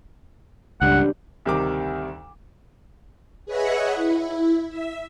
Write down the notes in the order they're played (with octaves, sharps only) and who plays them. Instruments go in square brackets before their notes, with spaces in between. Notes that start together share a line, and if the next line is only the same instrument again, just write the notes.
[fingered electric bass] C#2 G2 [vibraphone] D4 G4 D5 [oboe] F#5
[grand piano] D2 C3 D#3 G3 D6
[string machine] G#4 B4 C#5 D#5 E5 F#5
E4
E5